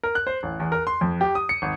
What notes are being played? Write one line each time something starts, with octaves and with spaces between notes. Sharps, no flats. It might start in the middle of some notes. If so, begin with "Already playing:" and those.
A#4
F#6
C5
A1
E2
A#4
C6
F2
G4
D#6
C#7
G#1